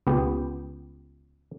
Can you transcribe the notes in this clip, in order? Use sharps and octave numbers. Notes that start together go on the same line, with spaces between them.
C#2 B3 G4